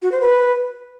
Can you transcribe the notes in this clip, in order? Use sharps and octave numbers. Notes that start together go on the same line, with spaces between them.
F#4
C5
B4